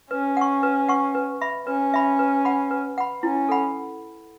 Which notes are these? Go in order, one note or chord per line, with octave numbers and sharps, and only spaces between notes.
C#4 B4
F#5 C#6
B4
F#5 C#6
B4
E5 B5
C#4 B4
E5 B5
B4
F#5 B5
B4
F#5 B5
C#4 E4
A4 F#5 B5